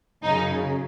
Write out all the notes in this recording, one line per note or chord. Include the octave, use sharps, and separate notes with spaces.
F#2 C#3 D#4